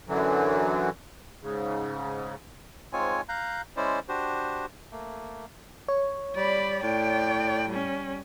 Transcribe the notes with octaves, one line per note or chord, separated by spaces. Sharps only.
F#2 D3 E3 F#3
G#2 C#3
G#2 G#3 C4 F4 C#5 G#5
F5 A#5 F#6 G6
G#3 C#4 E4 C5 D5
D4 F#4 G4 C5
A3 A#3
C#5
G3 D5 B5
A2 D5 G5
G3 C#4